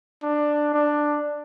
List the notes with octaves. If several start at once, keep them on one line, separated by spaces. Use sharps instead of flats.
D4
D4